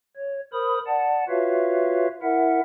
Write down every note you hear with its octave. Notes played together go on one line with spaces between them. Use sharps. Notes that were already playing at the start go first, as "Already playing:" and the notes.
C#5
A#4 C5 B5 D#6
D5 F#5 A5
F4 F#4 B4 C#5 E5 F5
E4 A#4 E5 F#5